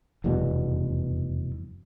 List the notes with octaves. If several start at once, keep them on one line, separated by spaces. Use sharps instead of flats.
F1 E2 G2 B2